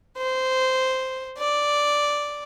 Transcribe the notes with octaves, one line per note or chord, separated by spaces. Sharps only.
C5
D5